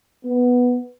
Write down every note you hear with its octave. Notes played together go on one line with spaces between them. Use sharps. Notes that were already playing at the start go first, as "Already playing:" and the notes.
B3